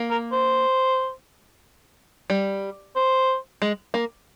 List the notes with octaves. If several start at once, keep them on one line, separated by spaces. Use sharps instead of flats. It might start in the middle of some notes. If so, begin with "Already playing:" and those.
Already playing: A#3
A#4
C5
G3
C5
G#3
A#3